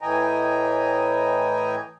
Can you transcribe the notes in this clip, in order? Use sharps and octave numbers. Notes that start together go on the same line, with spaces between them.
A2 E3 D#5 G5 G#5 A#5